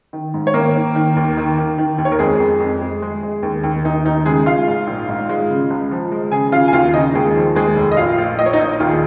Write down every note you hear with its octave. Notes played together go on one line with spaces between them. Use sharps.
D#3
G#2
C#5
D#3 A#3 A#4
D#3
D#3
D#2
D#3
D#3
D#3
D#2
C#5
A#4
F2 G#3 G#4
F2
F2
G#3
G#3
G#3
D#2
D#2
D#2 D#4
D#2 D#4
C#3 G#3 G#4
G#3 F4 F5
G#2
A#1
G#2
G#3
C#3
C#2
F3
G#3
C#3 G#4 G#5
C#3 F4 F5
G#5
D#2 F4 F5
C#3 D#4 D#5
D#2 G#3 G#4
F3
D#2 G#3 G#4
F1
D#5
A#1 F4 F5
A#1
A#1 D#5
C#5
D#4 D#5
A#1
D#2 F4
G#4